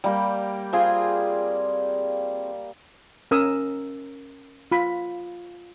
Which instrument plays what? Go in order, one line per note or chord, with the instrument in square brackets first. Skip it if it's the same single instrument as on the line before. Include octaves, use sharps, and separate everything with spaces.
[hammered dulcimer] G3 A#3 G4
[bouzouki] C4 F4 G#4
[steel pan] C#4 A#4 D#6 E6
F4 B5